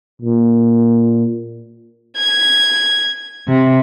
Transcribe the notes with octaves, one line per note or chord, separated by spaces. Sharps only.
A#2
G#6
C3